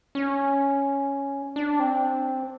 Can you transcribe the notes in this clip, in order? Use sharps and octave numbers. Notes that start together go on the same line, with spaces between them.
C#4
D4
C4